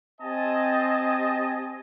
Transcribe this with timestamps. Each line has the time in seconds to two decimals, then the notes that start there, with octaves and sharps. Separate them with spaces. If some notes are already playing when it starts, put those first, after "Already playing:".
0.21 C4 G4 D#5 G#5 A5